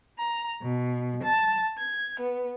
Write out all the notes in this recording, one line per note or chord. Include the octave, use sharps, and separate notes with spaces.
A#5
B2
A5
G#6
B3